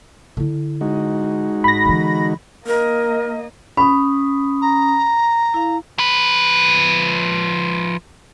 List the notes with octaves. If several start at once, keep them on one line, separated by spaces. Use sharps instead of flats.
D3 E4
G#3 D#4 F#4
G#1 B5 A#6
D3 E3
A#3 A#4 D#5
C#4 B5 D#6
A#5
E4 F5
F3 B4